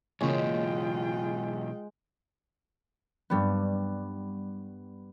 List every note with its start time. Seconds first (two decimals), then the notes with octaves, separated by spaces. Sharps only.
0.21 B1 C#3 E3 G#3 A#3 F4 C#5 G5
3.30 G2 G3 B3